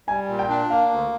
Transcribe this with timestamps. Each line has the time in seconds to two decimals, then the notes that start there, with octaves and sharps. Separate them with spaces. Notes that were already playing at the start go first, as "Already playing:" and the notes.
0.08 G3 G#5
0.28 A#2
0.39 G5
0.49 D4
0.70 A#3 F5
0.91 D2